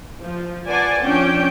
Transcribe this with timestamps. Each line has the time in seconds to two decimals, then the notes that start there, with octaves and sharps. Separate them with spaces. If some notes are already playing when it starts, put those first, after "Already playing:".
0.22 F3
0.66 B4 C5 D5 F#5 G#5 A5
1.02 F3 C#4 D4 C#5 G5